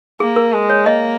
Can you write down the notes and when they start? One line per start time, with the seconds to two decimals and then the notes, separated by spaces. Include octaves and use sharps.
0.20 A#3 G#4
0.36 A#4
0.53 G#3
0.70 C#5
0.86 A#3 D#5